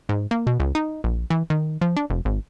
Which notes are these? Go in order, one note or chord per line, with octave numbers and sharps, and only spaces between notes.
G#2
A#3
B2
C#2
D#4
A#1
E3
D#3
F3
D4
F1
G#1